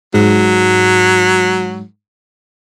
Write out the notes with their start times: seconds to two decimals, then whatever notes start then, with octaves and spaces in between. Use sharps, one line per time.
0.14 G#2 F#3